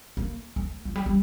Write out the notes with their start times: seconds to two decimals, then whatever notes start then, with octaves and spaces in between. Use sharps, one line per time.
0.17 A#3
0.56 A3
0.85 F3
0.96 G3
1.06 G3